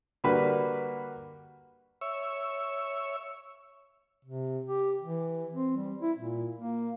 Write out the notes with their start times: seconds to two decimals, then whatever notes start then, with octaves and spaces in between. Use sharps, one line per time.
0.24 D3 G3 A#3 F#4 B4 B5
2.01 C#5 E5
4.25 C3
4.67 G4
5.02 E3
5.52 C4
5.76 G3
6.01 E4
6.18 A#2
6.55 A#3